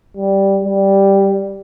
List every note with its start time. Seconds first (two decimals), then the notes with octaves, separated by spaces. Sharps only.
0.17 G3
0.64 G3